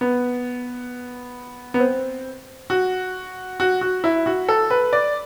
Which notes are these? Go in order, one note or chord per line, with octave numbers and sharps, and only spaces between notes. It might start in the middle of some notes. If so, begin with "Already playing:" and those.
B3
B3
C4
F#4
F#4
F#4
E4
F#4
A4
B4
D5